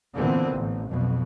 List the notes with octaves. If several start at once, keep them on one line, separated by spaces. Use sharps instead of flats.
A#2 D3 E3 B3 C4
A1
B1 F2 B2